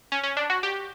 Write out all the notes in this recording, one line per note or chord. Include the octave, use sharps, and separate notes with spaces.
C#4
C#4
D4
F#4
G4